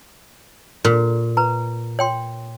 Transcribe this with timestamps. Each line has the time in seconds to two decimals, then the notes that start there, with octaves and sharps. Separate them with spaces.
0.84 A#2
1.37 B4 A#5
1.99 C#5 G5 C6